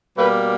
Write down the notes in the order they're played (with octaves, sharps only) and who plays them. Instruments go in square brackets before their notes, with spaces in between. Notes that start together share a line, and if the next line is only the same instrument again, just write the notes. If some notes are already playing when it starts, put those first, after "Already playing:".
[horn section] B2 G3 A#3 B4